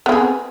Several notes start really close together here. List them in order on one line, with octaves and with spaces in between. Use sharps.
B3 C4 G#4